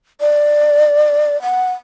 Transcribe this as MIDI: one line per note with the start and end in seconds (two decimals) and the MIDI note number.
0.21 1.41 74
1.42 1.72 78